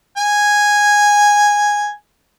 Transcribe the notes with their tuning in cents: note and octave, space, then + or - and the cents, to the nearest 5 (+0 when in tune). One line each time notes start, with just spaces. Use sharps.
G#5 -5